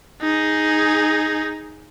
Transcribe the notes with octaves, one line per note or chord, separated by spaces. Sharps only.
D#4 G#4